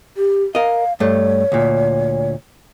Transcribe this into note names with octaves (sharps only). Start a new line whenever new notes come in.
G4
A#4 D#5 F5
G2 A3 C#5
D2 A#2